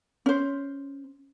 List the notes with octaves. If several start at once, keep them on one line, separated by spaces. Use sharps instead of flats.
C#4 C5